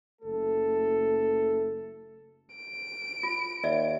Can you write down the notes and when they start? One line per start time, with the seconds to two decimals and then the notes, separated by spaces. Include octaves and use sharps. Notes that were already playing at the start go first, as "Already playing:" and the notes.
0.22 F#1 A3 A4
2.55 D7
3.23 F4
3.63 D#2 D5 E5